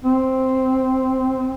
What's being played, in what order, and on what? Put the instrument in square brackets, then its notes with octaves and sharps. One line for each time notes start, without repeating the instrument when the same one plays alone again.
[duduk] C4